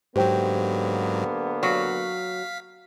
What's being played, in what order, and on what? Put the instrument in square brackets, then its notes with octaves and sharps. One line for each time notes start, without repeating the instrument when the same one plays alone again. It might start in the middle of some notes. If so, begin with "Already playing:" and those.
[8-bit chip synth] G#2 F#3 [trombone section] D3 A#3 B3 [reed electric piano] G4 C5 G5
[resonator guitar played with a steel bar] F#3 [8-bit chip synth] F5 B6